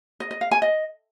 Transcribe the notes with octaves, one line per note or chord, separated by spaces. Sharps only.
D#5
D#5
F5
G#5
D#5